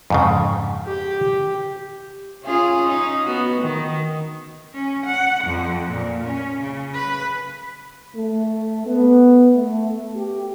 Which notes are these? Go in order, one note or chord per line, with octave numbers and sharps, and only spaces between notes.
F2 G#2 C#3
G4
C#4 F4 G#4
C#4 D#4
B3 F#4
D#3
C#4
F#5
F2
A#2
C#4
C#3
B4
A3
B3
A3
G4